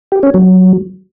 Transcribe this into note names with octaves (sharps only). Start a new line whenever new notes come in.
G4
C#4
F#3